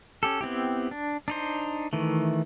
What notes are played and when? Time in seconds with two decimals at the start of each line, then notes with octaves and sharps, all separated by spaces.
0.23 C#4 G4 A4
0.41 B3 C4 E4 G4
0.91 D4
1.28 D4 D#4 C5
1.93 D#3 E3 A3